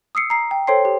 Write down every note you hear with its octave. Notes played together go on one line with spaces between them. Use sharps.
D#6 E6 C7 C#7
A#5 C7
G5
A4 C5 C#5 G5 C6 C7
G4